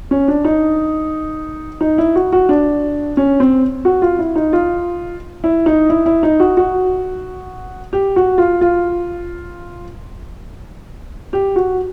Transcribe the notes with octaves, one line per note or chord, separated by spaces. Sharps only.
C#4
D4
D#4
D#4
E4
F#4
F#4
D4
C#4
C4
F#4
F4
E4
D#4
F4
E4
D#4
E4
E4
D#4
F#4
F#4
G4
F#4
F4
F4
G4
F#4